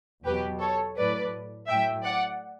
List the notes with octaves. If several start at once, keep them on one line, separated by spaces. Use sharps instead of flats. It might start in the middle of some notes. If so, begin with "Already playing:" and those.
E2 B2 F#3 G4 B4
A4 C#5
A2 F#3 B4 D5
A2 F#3 E5 G5
D5 F#5